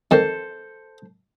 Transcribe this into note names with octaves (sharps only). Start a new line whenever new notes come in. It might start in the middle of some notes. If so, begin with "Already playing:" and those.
F2 D#3 A4 C5